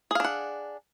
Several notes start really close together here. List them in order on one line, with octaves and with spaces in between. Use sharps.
G#4 F5 D4 F#5